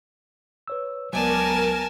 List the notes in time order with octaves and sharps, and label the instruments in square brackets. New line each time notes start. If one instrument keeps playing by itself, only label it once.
[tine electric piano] B4 C#5 E6
[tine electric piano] C#2 F#3 [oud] B3 C5 D5 [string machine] A#4 [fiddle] G#5 A5